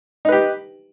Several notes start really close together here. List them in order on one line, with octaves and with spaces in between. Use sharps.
D#4 B4 G4